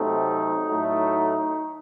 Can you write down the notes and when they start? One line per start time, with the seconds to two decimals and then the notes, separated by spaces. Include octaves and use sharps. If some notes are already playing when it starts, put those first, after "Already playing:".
Already playing: C3 F#3 A3 C4 D#4
0.69 A2 F#3 A3